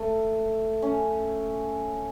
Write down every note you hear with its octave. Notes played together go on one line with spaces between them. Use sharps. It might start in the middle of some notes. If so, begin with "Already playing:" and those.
Already playing: A3
C#4